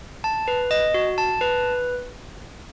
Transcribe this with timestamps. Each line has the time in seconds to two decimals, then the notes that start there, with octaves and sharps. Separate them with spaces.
0.24 A5
0.48 B4
0.71 D#5
0.94 F#4
1.18 A5
1.41 B4